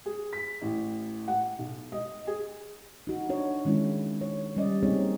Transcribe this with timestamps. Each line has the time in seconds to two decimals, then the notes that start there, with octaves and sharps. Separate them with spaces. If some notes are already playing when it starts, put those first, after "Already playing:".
0.06 G#4
0.33 B6
0.62 A1
1.28 F#5
1.59 B1
1.92 D#5
2.27 G#4
3.07 D#4 F#4
3.29 D4 F#4 C#5
3.65 D#3 G#3 C#4 E4
4.21 C#5
4.56 G3 C#4 D5 D#5
4.83 A#3 C4 C#4 D#4 G#4 C#5